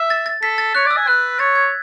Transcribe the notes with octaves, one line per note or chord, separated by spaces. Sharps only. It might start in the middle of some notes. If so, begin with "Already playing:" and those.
Already playing: E5
A6
A6
A4 B6
A6
C#5 F#6
D5
E6
G#5
B4 F#6
C#5 A6
G#6